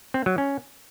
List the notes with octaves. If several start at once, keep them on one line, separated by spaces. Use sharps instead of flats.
C4
F#3
C#4